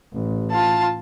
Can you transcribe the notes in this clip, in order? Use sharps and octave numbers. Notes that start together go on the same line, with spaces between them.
A1
F4 A5